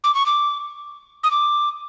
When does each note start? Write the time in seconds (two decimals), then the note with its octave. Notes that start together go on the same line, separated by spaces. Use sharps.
0.04 D6
0.14 C#6
0.26 D6
1.23 D#6
1.31 D6